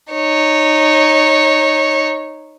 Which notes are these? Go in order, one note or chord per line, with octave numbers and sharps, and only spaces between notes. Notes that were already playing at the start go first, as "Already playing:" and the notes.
D#4 C#5